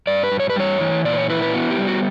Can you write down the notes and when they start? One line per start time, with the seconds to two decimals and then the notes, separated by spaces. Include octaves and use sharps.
0.07 G2 D5
0.24 B4
0.32 G2
0.40 C#5
0.50 B4
0.56 G3 C#5
0.80 E3
1.05 A#2 D5
1.13 B4
1.18 C#5
1.30 E4 B4
1.42 B4
1.54 B3 F#4
1.70 G4
1.79 G3
1.87 F#4